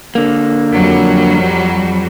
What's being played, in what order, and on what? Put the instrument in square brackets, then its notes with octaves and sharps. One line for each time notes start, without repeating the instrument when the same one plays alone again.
[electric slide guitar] D3 A#3
[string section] F2 F#3 G3